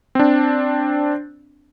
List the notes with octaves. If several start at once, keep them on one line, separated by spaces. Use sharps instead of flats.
C4 D4